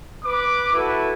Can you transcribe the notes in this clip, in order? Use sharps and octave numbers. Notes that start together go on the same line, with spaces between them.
B4 D6
E4 F#4 A4 B4 E5